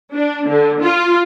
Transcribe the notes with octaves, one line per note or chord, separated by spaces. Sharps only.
D4
D3
F4